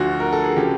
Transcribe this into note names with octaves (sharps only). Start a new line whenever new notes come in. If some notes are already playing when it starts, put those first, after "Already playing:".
Already playing: D2 D3 F3 F#4
A#4
A4
G#4
C#3 F3 G4